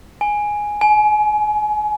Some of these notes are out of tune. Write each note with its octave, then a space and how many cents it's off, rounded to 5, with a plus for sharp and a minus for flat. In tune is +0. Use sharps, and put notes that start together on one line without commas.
G#5 +0
G#5 +30